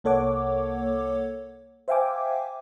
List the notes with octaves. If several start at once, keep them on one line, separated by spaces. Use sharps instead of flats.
C2 A#3 A4 C#5 F#5 D6
C5 E5 F5 G5 G#5 D6